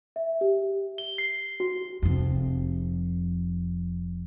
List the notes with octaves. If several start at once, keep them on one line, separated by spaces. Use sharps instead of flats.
E5
G4
G7
C7
F#4
F1 F2